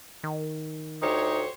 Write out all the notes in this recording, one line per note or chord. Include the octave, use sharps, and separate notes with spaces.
D#3
D2 D#4 G4 C5 C#5